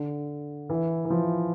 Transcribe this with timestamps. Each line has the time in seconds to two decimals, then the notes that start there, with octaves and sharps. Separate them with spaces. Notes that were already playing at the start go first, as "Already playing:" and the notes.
Already playing: D3
0.69 E3
1.05 E3
1.10 F3